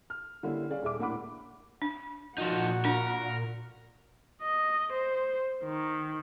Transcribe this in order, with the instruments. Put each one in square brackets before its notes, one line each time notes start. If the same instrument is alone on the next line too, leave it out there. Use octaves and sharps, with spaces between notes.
[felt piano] F6
D3 G3 A#3 C#4 D4 E4
C#4 G#4 D5 F5
D#1 G#4 E5 D6
A2 A#3 D4 F#5 B5 D6
[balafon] D4
[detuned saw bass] A#2 [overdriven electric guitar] F3 D#4 [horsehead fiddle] F#4 F#5
[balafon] D4 [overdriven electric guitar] A#4
[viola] D#5
C5
D#3